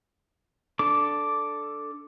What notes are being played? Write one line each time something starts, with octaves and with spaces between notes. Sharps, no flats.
D4 A4 D6